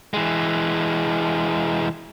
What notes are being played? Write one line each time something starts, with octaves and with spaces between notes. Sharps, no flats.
E3 G#3